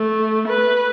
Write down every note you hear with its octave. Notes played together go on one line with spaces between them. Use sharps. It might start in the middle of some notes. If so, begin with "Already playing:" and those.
Already playing: A3
B4